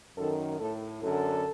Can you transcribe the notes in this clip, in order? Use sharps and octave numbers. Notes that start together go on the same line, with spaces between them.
F#2 D#3 A4
A2 A4
F#2 D3 A4